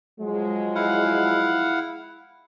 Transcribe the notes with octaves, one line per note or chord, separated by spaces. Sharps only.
F3 F#3 G#3
E4 F5 F#5